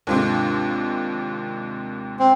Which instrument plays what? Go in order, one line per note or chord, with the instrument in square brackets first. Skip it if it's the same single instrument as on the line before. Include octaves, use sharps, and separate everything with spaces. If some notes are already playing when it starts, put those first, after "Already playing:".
[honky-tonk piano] D#2 G#2 C3 [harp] D4 F4 C5
[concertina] C4